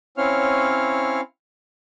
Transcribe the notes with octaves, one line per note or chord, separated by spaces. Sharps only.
C4 C#4 E4 C#5 F5 F6